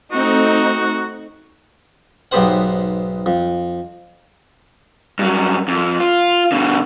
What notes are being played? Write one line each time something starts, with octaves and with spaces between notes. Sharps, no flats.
A3 C4 D#4 F#4
B1 G#2 B3 G4 C5 F#5
F2
G2 F#3
F2
F4
B2 D3